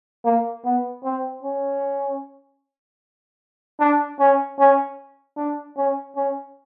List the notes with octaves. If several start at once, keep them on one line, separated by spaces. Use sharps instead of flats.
A#3
B3
C4
C#4
D4
C#4
C#4
D4
C#4
C#4